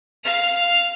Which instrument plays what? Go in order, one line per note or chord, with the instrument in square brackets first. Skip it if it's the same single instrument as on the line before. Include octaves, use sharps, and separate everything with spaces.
[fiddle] F5 F6